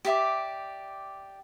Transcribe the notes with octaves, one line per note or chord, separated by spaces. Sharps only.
G4 D5 E5 D6